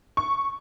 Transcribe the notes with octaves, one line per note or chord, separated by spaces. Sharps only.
C#6